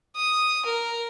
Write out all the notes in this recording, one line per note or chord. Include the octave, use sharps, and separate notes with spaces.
D#6
A#4